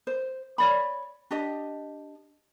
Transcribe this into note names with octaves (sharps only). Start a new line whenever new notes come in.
C5
C#5 D5 B5
D4 G4 D#5